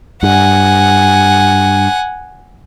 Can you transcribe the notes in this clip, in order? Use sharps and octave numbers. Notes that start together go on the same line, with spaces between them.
G2 F#5 G#5